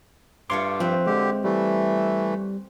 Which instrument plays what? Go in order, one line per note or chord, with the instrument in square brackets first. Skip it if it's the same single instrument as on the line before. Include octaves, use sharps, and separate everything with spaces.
[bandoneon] G2 [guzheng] A3 F4 C#5 [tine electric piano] C6 D6
[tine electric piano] F3 [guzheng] C4 B4
[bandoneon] D3 G4 [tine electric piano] G#3
[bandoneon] E3 A3 [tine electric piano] G3